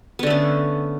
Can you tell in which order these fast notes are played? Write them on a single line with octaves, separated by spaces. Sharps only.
B3 D3 A3 C#4